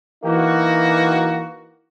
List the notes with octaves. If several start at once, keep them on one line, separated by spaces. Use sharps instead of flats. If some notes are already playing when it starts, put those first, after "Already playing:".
E3 A#3 D#4 F#4